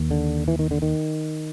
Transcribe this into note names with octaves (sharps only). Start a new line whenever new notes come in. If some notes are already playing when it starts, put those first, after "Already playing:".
Already playing: D#2
D3
E3
D#3
D3
D#3